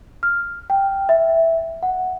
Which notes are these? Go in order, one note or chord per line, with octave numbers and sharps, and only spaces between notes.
F6
G5
E5
F#5